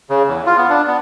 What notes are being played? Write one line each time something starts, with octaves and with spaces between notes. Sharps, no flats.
C#3
E2
F4
B3
D4
B3